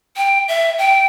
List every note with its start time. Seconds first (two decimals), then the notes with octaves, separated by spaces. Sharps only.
0.17 G5
0.48 E5
0.78 G5